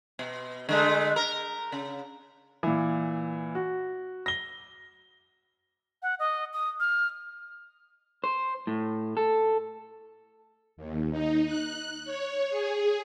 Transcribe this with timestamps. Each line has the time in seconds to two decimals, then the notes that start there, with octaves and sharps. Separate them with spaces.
0.19 B2
0.69 D3 G#3 A3
1.16 A#4
1.72 C#3
2.63 A#2 E3
3.55 F#4
4.26 A#6 G7
6.02 F#5
6.19 D#5
6.53 D#6
6.80 F6
8.24 C5
8.67 A2
9.17 A4
10.77 D#2
11.11 D#4
11.46 F#6
12.04 C#5
12.49 G#4